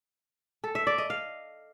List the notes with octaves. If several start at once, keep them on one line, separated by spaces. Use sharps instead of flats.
A4
E5
D5
D#5
F5